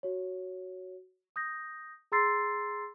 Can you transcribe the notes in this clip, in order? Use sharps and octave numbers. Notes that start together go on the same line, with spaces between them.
F#4 C#5
D#6 G6 A#6
G#4 A#5 C6 E6 A6 C7